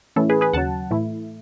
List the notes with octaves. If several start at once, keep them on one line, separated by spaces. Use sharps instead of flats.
A2 E3 A3 C#4 E4 A4
G#4 B4
G#4 B4
D#2 C#3 F#3 F#5 A5
A2 E3 A3 E4